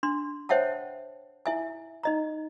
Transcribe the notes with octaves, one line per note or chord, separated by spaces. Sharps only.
D4 C6
C5 C#5 E5 F#5 G5 A5
E4 E5 G#5
D#4 D#5 A#5